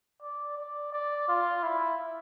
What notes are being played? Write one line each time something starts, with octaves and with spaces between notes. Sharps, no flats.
D5
D5
D5
F4
E4